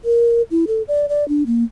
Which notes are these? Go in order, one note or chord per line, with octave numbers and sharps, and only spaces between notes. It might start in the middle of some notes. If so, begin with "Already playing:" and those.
A#4
E4
A4
D5
D5
D4
A#3